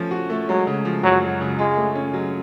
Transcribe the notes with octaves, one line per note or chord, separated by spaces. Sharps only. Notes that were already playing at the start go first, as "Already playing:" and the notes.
Already playing: F3 A3 C#4
F#4
A3
F#3 G#3
C#3
F3
F#2 F#3
G#3
C#3
G#3 F4
A3
C#4
F#3